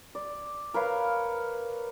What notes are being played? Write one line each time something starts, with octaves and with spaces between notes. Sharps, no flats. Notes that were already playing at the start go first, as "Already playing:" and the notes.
D5
A#4 B4 C#5 F5